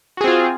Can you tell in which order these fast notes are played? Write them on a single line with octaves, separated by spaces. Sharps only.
F#4 G#4 C4 F4